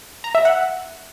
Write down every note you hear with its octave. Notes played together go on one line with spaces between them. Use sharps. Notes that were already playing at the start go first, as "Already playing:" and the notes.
A#5
E5
F#5